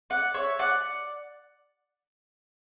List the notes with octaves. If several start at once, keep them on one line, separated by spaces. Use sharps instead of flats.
D5 F#5
C#5 E5
D5 F#5